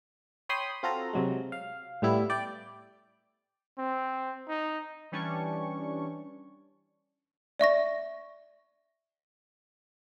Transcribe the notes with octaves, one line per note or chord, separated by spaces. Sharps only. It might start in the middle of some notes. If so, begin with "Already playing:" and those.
C#5 G5 B5 C6 D#6
C4 F4 F#4 A4 A#5
C3 F#3 G#3
F5
A2 G3 B3 E4
D5 G5
C4
D#4
E3 G3 C#4 D4 C#6
D5 E5 C#6 A#6